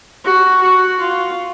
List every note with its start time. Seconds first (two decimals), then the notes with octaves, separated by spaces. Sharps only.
0.24 F#4
0.61 F#4
0.99 F4